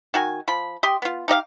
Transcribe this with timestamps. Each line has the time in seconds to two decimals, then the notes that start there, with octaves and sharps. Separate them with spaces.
0.14 D#3 F#4 G#5
0.48 F3 B5
0.83 G4 D#5 G5 C6
1.02 B3 F4
1.28 D#4 G4 D#5 F5